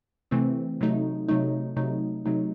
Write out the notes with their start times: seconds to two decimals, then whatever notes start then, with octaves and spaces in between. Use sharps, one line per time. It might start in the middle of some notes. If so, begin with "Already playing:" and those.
0.31 C3 E3 A3 C4
0.81 C3 F#3 A3 D#4
1.29 C3 F#3 A3 D#4
1.76 C3 F#3 A3 D#4
2.26 C3 F#3 A3 D#4